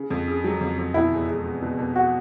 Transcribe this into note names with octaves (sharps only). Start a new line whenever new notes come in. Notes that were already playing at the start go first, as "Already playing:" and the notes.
Already playing: C#3
F2
C#3
F#3
F2
F2
B2 E4
E2
G#3
B2
B2
B2
F#4